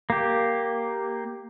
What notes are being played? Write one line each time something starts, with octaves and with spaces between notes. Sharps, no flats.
A#3 G4